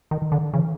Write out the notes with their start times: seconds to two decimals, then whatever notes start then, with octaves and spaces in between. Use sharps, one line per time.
0.11 D#3
0.22 D#3
0.32 D3
0.53 C#3 E3